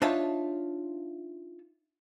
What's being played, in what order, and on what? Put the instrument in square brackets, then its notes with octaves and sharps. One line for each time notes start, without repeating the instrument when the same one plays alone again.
[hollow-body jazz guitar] D4 D#4 F4 C#5 E5 A5